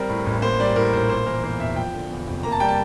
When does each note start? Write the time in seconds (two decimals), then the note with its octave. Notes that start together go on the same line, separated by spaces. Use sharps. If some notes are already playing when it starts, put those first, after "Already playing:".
Already playing: G3 C4 A#4
0.09 A2
0.26 A1
0.42 A#3 C5
0.60 G3 D5
0.75 A2 A#4
0.93 A#1 C5
1.09 A#3 C5
1.26 E3 A#4
1.43 E2 C5
1.60 E1 E5
1.76 F3 G5
1.94 D3
2.10 E2
2.27 F1
2.43 A#3 A#5
2.52 A5
2.60 G3 G5
2.68 A5